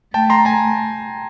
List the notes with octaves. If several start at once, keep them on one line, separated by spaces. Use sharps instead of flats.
A3 G5 A5
A#5 C6
G#5 A#5